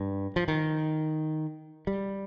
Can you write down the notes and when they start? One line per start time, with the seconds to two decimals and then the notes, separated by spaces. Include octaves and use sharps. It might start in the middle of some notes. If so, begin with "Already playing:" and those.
Already playing: G2
0.36 F3
0.48 D#3
1.87 G3